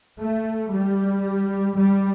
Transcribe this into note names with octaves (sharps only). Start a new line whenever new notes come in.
A3
G3
G3